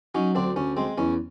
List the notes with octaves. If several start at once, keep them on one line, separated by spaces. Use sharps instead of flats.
F#3 C#4 D#4
D2 C4 D4
D2 C#4
G#3 C4
E2 C#4